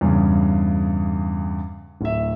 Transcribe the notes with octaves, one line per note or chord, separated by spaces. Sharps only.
E2 G2 C#3
D1 E5